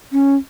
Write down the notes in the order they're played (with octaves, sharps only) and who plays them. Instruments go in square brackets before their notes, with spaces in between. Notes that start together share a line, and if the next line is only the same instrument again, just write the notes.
[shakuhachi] C#4